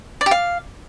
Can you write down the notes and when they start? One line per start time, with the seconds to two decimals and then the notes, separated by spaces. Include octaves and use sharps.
0.21 D5
0.26 G4
0.31 F5